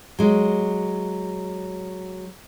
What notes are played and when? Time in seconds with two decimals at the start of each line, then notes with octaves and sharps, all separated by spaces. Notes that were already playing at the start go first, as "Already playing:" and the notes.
0.19 F#3 G#3